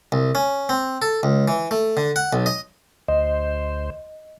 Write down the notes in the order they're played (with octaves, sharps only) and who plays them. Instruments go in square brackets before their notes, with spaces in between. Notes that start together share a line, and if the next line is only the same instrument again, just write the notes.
[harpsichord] C2
C#4
C4
A4
C#2
E3
A3
D3
F#5
B1
D#5
[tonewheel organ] D2 C5 [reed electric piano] D#5